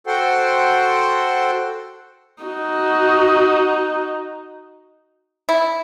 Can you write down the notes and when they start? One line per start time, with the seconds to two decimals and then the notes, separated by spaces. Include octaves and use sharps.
0.07 F#4 A4 C5 F#5 G5 C6
2.43 D#4 F#4
5.49 E4